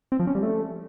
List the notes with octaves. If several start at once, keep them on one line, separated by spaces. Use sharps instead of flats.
C4
F3
C#4
G3
A3